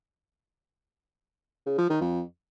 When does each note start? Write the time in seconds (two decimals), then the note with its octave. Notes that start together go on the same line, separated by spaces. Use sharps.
1.66 C#3
1.78 F3
1.90 D#3
2.01 F2